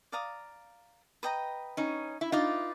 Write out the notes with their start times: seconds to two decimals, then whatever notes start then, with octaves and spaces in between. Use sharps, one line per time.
0.12 D5 F5 A#5 D#6
1.23 B4 D#5 G5 A#5
1.77 C#4 D#4
2.21 E4
2.32 D#4 F4 B4 D5 F5